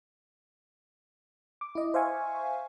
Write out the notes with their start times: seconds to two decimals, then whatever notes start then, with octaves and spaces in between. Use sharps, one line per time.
1.61 D6
1.75 E4 D#5
1.94 C5 E5 F5 G#5 C#6